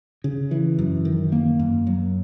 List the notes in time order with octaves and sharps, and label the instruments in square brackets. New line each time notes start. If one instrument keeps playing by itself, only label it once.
[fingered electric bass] C#3
E3
F#2
D#3
A#3
F#2
F#3